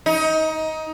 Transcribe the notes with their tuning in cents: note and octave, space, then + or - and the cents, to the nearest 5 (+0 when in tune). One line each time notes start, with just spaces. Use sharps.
D#4 +20